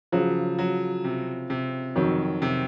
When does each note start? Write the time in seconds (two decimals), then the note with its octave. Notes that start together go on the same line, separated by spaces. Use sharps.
0.12 C#3 F3 F#3
0.59 F#3
1.04 C3
1.50 C3
1.96 F2 D#3 F#3
2.42 C3